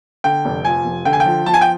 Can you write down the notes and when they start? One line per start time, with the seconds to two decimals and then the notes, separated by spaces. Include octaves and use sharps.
0.24 D3 G5
0.45 F1
0.65 F3 G#5
0.85 F1
1.05 D3 G5
1.13 G#5
1.20 G5
1.26 F3
1.46 F3 A5
1.54 G#5
1.61 G5